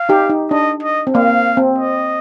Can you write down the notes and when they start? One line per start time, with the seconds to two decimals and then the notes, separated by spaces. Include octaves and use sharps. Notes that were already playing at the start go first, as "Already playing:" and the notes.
Already playing: F5
0.09 D#4 G4
0.30 D#4
0.51 D4 D#5
0.83 D#5
1.07 C4
1.15 A#3 F5
1.57 C4
1.78 D#5